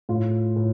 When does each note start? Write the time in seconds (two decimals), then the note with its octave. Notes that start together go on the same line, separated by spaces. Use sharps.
0.09 A2 F4
0.56 A2